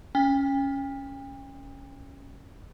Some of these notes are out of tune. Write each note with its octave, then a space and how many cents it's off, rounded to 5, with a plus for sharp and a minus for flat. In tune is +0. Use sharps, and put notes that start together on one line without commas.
C#4 +0 G5 +40